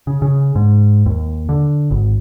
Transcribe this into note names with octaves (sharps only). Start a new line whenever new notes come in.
C#3
C#3
G#2
D#2
D3
G#1